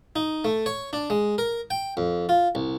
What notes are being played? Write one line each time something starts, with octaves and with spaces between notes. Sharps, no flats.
D#4
A3
C#5
D4
G#3
A#4
G5
F2
F4
C2